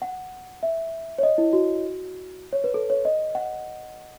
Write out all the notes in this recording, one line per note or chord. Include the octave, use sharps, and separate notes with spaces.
F#5
E5
C#5
D#5
E4
F#4
C#5
B4
A4
C#5
D#5
F#5